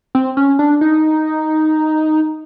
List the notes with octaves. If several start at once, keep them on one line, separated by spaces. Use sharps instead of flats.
C4
C#4
D4
D#4